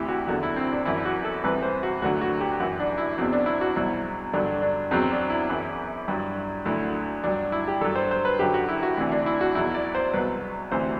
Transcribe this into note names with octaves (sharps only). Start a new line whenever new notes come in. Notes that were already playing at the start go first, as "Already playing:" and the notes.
Already playing: D2 C3 E3 E4 G4
F#4
E2 D3 F#3 F#4
E4
C4
D4
F#2 E3 E4
F#4
A4
C2 C3 E3 B4
C5
F#4
D2 D3 F#3 F#4
F#4
G4
F#2 E3 F#4
D4
E4
E2 B2 F#3 C4
D4
E4
F#4
C2 B2 F#3 E4
G2 D3 F#3 D4
D4
E2 B2 F#3 C4
D4
E4
F#2 E3
G2 F#3
D2 D3 F#3 E4
G2 F#3 D4
E4
G4
G2 F#3 A4
C5
C5
B4
F#2 D3 F#3 G4
F#4
E4
F#4
D2 C3 E3 D4
D4
E4
F#4
E2 B2 F#3 E4
D5
C5
C2 B2 F#3 B4
D2 C3 E3 C5